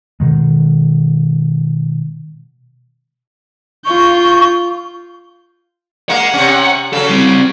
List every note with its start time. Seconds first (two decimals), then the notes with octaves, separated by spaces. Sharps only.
0.20 B2 D#3 G#3
3.85 F4 C#6 G6
6.09 G#3 A#3 F#5
6.34 C3 C#4
6.93 C#3 F#3 A4
7.10 G3 C4